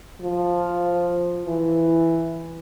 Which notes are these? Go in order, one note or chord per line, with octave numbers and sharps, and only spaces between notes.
F3
E3